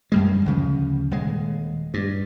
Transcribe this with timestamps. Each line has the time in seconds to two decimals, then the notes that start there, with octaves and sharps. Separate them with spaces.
0.12 F#2 G3 G#3
0.46 D2 C#3 F3
1.11 D#1 G#3
1.94 G2